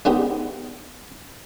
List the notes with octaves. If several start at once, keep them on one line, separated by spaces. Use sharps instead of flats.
G#3 A#3 B3 D4 D#4 G4